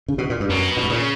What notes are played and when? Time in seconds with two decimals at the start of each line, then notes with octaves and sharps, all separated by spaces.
0.08 C#3
0.18 B2
0.30 A#2
0.40 G2
0.49 F#2 B2
0.77 A#2
0.84 G2
0.90 A#2 C#3